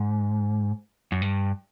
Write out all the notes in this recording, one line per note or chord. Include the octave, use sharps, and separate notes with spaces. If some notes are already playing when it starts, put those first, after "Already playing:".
Already playing: G#2
F#2
G2